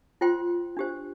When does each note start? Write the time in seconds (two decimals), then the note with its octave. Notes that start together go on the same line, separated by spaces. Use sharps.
0.21 F4 C5 G5 C6
0.77 D4 G4 C5